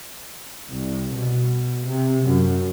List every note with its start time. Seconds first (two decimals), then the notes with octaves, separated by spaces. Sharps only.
0.69 C2
1.16 B2
1.86 C3
2.27 F#2